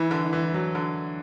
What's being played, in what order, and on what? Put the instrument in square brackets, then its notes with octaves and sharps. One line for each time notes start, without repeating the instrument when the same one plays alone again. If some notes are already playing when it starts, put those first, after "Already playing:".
Already playing: [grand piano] E3 [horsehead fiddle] E4
[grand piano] D3
E3
F#3
D3